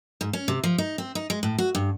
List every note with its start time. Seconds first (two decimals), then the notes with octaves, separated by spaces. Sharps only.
0.21 G#2
0.33 C#4
0.48 C3
0.64 F3
0.78 D#4
0.98 C4
1.15 D#4
1.30 G#3
1.43 A2
1.58 F#4
1.75 G2